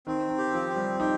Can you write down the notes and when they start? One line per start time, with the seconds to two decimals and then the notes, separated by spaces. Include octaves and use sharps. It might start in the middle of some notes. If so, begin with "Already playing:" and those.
0.07 D#3 C4
0.30 D#3
0.38 G4
0.54 F3
0.69 C4
0.76 G3
1.00 D#4 G4